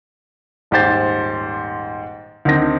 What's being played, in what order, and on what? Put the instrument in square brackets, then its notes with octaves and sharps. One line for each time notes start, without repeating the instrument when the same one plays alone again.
[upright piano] D#1 G#2 G4 C5 A6
D2 D#3 C4 A#6